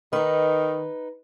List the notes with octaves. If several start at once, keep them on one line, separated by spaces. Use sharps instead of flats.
D#3 D#4 B4